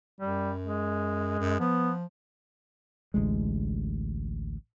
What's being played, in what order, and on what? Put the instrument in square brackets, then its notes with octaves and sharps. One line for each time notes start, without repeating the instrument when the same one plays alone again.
[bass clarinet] F#2 [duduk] G3
[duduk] G#3
[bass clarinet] F#2
[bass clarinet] F3 [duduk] B3
[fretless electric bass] A1 D2 G#3